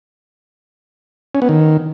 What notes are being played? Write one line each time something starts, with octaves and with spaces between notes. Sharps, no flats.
C#4
B3
D#3